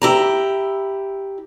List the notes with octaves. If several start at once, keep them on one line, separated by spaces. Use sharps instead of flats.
E4 G4 A#5